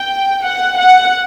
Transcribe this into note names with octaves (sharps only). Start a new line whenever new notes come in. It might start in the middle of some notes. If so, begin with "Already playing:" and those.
Already playing: G5
F#5
F#5